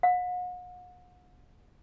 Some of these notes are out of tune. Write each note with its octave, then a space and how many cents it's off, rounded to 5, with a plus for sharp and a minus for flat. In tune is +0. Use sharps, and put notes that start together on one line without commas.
F#5 -40